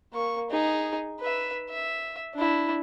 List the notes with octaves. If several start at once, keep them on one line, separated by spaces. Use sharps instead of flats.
A#3 C#6
D#4 G#4
B4 E5
E5
D4 E4